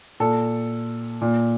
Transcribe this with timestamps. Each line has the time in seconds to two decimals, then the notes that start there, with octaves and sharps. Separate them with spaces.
0.20 A#2 A4
1.21 A#2